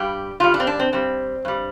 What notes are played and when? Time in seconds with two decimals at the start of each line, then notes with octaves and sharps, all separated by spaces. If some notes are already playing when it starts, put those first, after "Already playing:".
Already playing: G2 G3 G4
0.40 G2 G3 F4
0.54 D4
0.60 C4
0.67 D4
0.79 C4
0.92 G2 G3 C4
1.45 G2 G3